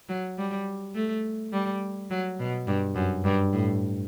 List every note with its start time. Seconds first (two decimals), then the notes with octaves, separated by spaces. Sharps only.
0.09 F#3
0.38 G3
0.95 A3
1.53 G3
2.10 F#3
2.39 B2
2.67 G2
2.96 F#2
3.25 G2
3.53 A2